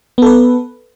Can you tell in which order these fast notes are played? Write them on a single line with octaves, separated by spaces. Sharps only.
B3 A4 B4